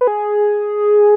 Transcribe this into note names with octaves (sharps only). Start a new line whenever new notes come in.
B4
G#4